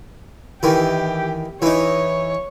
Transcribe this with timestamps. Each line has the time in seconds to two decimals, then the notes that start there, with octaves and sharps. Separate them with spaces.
0.63 D#3 E3 G4
1.62 E3 D#4 C#5